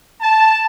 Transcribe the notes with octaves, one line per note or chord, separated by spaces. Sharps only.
A5